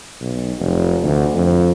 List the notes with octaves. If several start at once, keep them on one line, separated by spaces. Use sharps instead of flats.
B1
F1
D2
F2